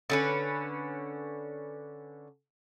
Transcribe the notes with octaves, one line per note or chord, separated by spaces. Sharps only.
D3 C#4 B4